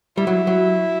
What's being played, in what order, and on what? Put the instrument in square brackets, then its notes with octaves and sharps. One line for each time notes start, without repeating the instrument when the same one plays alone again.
[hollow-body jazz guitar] G3 [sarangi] E4
[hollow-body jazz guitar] F#3
F#3